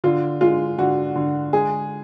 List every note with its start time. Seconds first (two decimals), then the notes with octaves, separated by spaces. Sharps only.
0.04 D3 F4
0.41 G#3 F4
0.78 D3 F#4
1.15 D3
1.53 G#3 G#4